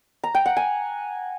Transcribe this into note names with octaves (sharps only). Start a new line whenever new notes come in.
A#5
G5
F#5
G#5